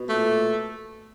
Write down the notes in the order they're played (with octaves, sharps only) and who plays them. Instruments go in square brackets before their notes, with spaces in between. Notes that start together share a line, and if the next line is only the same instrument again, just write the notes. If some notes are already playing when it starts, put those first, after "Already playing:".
Already playing: [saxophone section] B2
A#2 A3